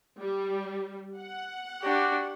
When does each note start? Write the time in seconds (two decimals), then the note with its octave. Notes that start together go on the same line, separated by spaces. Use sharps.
0.19 G3
1.19 F#5
1.83 D4 F#4 G4